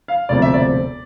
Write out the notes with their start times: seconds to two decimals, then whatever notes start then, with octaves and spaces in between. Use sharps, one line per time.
0.08 F5
0.29 E1 D2 C3 F3 D5
0.42 E5
0.54 D5